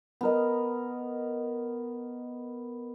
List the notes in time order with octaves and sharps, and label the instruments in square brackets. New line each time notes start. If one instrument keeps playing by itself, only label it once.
[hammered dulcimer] B3 A#4 D#5